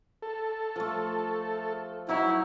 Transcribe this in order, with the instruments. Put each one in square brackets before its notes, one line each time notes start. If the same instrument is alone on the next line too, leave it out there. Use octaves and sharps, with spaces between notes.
[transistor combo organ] A4
[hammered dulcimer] F3 A3
[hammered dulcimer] F#3 D#4 C#5 [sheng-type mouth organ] E4